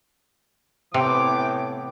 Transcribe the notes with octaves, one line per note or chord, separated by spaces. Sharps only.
A2 C3 E3 B3 G5 D6